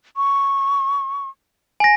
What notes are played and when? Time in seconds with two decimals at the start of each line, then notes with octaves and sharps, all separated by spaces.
0.17 C#6
1.80 G#5 A#6